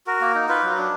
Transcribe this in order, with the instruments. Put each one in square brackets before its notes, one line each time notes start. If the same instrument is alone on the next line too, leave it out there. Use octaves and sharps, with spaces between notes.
[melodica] F#4 A#4
A#3
D#4
F4 B4
F#3
D4